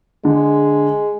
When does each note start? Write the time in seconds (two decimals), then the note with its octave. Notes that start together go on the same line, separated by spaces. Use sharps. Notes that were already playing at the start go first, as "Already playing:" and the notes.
0.25 D3 G#3